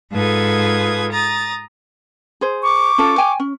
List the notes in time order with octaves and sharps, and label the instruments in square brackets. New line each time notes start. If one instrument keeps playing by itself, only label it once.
[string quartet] G#2 F4 A4 B4 D#6 G#6
A#5 D#6 A6
[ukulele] G#4 C5
[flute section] C#6 D6
[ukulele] C#4 F4 A4
G5 G#5
C#4